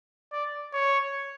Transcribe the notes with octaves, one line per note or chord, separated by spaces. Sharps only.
D5
C#5